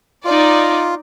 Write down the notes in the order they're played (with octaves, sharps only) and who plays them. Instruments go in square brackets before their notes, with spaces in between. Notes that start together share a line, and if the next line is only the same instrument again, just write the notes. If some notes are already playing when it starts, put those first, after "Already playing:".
[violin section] D#4 D5 [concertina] F4